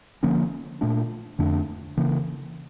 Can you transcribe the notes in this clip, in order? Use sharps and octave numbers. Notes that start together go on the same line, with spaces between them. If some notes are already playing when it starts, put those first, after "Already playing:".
D3 F3 A#3 C#4
A#2 A3 D4
F2 D3 A3 D4
C#3 E3 A#3